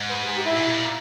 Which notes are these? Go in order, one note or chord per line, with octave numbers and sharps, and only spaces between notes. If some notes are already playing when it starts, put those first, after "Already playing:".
Already playing: G#2
B4
G#4
G4
E4
A#2
B2
A#2